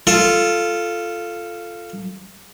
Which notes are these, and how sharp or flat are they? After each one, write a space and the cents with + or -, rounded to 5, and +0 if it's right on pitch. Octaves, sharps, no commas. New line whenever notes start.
F4 -10 A4 +0